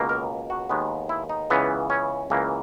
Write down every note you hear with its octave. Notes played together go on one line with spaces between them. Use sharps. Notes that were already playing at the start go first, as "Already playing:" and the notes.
Already playing: C#2 B2 A#3
A#4
F#4
D#2 D#3 G#3 B3
E4
D#4
C#2 C#3 E3 B3
C#4
C#2 C#3 E3 A#3